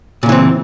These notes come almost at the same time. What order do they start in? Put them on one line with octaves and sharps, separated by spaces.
A#2 C#3 E3 C4